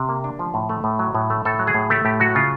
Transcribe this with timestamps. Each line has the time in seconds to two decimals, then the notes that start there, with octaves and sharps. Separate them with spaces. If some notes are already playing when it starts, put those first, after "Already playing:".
Already playing: C3 G4
0.09 A#3
0.24 D4
0.39 F3
0.54 A2
0.69 A3
0.84 A2
0.99 F#3
1.15 A2
1.30 A3
1.45 A2 A4
1.59 F#3
1.67 G#4
1.74 A2
1.90 A3 G4
2.05 A2 G4
2.20 F#3 F#4
2.35 C#3 F4